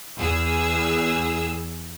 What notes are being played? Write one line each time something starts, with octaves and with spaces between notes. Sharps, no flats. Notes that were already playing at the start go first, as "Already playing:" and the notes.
E2 G#4 E6